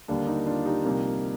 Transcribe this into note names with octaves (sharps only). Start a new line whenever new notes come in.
D#2 D3 G3 A#3 D4
D#4
D4 F4
D#4 G4
C2 C3 F3 A#3